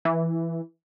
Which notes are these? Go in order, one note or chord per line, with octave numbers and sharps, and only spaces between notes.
E3